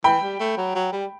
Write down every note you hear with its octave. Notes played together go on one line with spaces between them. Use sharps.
E3 G5 B5
G3
A3
F#3
F#3
G3